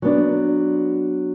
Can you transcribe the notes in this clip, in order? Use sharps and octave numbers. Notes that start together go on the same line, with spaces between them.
F#3 B3 D4